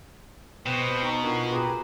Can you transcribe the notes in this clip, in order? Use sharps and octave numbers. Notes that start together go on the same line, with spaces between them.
B2 C4 B4 G5
D#4 A#5 C#6
D4 F4 F#4 A#4
G4 G#4 B4 A#5 C6